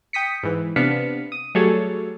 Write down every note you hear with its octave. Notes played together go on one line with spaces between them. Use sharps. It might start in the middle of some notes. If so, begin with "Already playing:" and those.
G5 D#6 B6 C#7
G#2 E3
C3 B3 D4 F5 B6 C#7
D#6
F#3 G3 A3 G#4 A4 C#5